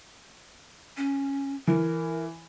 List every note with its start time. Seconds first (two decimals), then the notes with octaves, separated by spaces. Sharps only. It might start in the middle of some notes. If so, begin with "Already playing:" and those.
0.97 C#4
1.67 E3 A#4